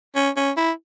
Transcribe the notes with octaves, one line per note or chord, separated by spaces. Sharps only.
C#4
C#4
E4